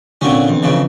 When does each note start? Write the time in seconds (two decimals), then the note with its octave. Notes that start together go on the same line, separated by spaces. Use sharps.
0.21 A#2 D3 F#3 C4 C#4
0.48 E2
0.63 F2 C#3 E3